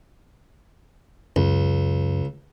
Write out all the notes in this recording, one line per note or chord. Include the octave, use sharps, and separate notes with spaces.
C#2 F#2